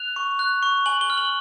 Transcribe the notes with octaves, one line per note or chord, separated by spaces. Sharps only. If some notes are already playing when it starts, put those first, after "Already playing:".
Already playing: F#6 F7
C#6
F#6
C#6
G#5 F#7
G7
F6
F#7